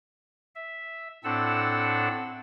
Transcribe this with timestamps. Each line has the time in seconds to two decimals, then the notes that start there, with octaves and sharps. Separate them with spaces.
0.55 E5
1.24 A2 C4 D4 A4 F#5 E6